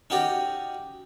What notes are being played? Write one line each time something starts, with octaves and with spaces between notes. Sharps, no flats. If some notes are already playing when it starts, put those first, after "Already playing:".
C#4 D#4 F#4 G4 D5